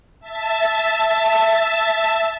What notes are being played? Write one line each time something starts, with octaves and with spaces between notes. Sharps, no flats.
E5 A5